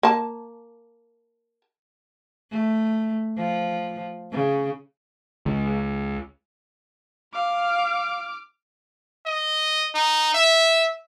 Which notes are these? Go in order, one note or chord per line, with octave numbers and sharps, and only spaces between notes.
A#3 A5
A3
F3
C#3
C#2
F5 D6 F6
D#5
D#4
E5